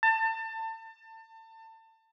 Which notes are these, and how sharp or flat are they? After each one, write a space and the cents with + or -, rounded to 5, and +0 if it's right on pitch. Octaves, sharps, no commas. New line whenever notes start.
A5 +30